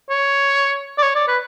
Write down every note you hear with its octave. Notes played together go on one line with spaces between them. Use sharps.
C#5
D5
C#5
D5
B4